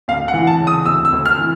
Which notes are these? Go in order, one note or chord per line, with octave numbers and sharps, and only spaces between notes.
D2 F5
F#5
E3
A5
C#3
D#6
D2 E6
E6
D2
F6
E3